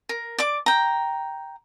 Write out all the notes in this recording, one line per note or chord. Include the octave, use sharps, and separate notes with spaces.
A#4
D5 D6
G5 A#5